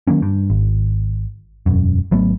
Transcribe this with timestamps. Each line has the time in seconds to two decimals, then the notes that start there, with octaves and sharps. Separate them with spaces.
0.07 D#3 F#3 A#3 C#4
0.22 G2
0.50 G#1
1.66 E1 F#2
2.11 G#1 F#3 A3 B3